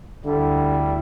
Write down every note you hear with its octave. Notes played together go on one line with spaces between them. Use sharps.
D2 D3 G3 E4